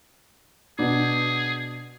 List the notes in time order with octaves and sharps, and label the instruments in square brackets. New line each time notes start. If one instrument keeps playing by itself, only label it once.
[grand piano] B2 B3 D4 [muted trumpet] G#4